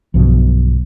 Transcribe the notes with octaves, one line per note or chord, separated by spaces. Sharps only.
B1 G2 B2 F3